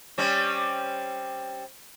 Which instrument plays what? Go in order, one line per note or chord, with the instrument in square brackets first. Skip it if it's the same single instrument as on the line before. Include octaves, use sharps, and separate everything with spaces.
[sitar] G3 C4 C#4